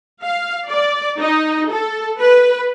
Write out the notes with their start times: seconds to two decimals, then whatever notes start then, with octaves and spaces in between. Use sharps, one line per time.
0.22 F5
0.67 D5
1.20 D#4
1.72 A4
2.20 B4